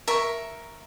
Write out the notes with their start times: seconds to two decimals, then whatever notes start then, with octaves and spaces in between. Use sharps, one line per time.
0.08 A#4 E5 C#6